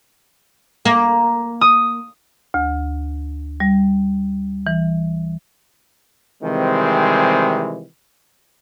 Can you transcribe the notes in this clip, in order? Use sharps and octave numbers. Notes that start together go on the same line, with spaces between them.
A#3
D#6
D2
G3
E3
C3 D#3 E3 G3 G#3 C4